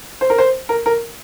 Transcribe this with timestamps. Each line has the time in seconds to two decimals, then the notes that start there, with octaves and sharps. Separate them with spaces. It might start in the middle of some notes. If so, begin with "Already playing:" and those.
0.21 C5
0.30 A#4
0.38 C5
0.69 A#4
0.86 A#4